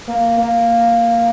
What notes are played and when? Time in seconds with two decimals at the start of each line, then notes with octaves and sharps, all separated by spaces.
0.09 A#3
0.40 A#3